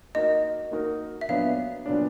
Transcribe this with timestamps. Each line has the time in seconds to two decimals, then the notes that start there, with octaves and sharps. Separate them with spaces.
0.14 A#3 D#4 F#4 A#4 D#5
0.71 A#3 D#4 F#4 A#4
1.21 E5
1.28 A#2 F#3 B3 D4 F5
1.86 A#2 F#3 B3 D4